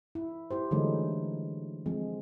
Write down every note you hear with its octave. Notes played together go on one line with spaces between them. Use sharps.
E4
E4 G4 C5
D3 E3 F#3 G#3 A3 D#4
F3 G#3 C4